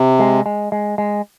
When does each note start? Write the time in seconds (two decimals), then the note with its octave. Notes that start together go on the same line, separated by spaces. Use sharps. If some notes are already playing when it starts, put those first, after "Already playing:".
Already playing: C3
0.19 G#3
0.46 G#3
0.72 G#3
0.98 G#3